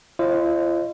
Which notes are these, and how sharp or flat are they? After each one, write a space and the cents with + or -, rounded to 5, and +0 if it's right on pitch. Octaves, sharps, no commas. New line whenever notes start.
F4 -45 C5 +35 D#5 -30